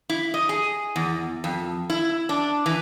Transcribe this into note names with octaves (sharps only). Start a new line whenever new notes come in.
E4
D#5
G#4
E2
F2
E4
D4
E3